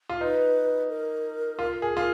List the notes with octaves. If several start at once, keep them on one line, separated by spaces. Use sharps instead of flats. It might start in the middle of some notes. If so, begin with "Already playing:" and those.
F4
D#4 B4
A#4
F4
G#4
F4